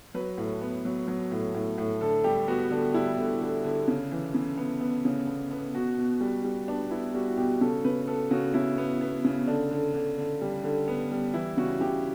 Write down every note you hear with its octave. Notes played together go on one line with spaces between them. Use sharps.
F#3 B4
A2
B3
F#3
F#3
A2
A2
A2
D3 A4
G3 G4
B3 F#4
D3 D4
G3 E4
D3
D3
D3
C#3
E3
C#3
B3
B3
C#3
B3
B3
B2 F#4
B2
G3
G3
B3 D4
B3 E4
G3 F#4
F#4
B2 G4
C#3 A4
C#3 B4
B3 A4
C#3 F#4
C#3 E4
B3
B3
C#3
D3 D4
D3
D3
D3
G3
D3
B3
G3
E3 E4
C#3 F#4
C#3 G4